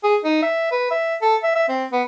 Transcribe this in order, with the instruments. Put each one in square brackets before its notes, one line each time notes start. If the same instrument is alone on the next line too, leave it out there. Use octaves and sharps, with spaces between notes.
[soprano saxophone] G#4
D#4
E5
B4
E5
A4
E5
E5
C4
B3